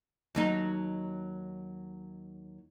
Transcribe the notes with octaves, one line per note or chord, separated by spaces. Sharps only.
D#2 F#3 D#4